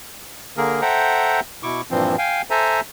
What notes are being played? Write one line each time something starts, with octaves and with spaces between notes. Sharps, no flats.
D3 A#3 G#4 A#4
A4 C5 E5 F#5 G5 A#5
B2 E4 C#6 D6
G2 A#2 E3 F3 C4
F5 G5 G#5
A4 C5 E5 G#5 A#5